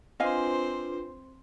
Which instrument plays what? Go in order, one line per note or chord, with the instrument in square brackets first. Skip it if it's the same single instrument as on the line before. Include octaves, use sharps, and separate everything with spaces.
[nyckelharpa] C4 C5 [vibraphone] D4 F4 B4 [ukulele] D#5 F5 G#5